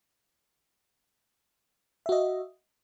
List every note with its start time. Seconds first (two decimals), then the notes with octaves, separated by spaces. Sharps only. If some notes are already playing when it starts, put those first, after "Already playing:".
2.06 E5
2.09 F#4
2.12 D#5